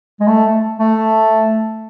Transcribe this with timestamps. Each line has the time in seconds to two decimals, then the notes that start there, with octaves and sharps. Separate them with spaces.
0.20 G#3
0.28 A3
0.79 A3